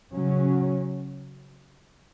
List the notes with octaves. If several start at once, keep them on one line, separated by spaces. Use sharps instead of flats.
C#3 F#3 C#4